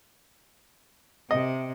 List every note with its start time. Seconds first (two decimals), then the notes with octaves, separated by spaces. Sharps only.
1.31 C3 D#5